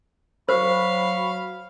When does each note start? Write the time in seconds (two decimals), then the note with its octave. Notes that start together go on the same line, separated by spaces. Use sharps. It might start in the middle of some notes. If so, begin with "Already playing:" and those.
0.49 F#3 C5 F5 B5 C#6